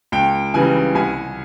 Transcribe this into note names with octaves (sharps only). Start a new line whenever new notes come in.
C#2 G5
C#3 E3 G3 G#5
C2 G#5